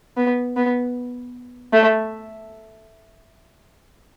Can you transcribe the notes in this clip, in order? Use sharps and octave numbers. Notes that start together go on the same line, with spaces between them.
B3
B3
A3